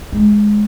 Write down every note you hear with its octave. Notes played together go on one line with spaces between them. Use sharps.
G#3